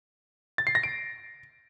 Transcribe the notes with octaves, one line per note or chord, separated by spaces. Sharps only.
A6
C7
A#6
D7